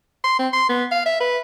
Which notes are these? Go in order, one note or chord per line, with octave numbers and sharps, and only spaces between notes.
C6
C4
C6
B3
F5
E5
B4